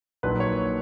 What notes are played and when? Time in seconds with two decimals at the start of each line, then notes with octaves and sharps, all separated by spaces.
0.23 A#1 A#2 F#3 A#3 D#4 B4
0.40 C#5